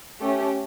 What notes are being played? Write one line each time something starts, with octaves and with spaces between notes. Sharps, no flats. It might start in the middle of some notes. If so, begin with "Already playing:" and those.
A3 C#4 G4